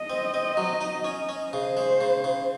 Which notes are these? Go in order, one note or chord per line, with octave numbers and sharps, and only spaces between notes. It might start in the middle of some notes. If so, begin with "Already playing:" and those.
Already playing: D#5
C4
C4
F#3
D#4
C#4
C#4
C#3 C5
G#3
C#3
C#3